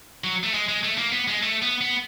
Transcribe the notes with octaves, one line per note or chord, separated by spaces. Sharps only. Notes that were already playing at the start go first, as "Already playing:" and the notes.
F#3
A3
G#3
G#3
A3
A#3
B3
G#3
A3
B3
B3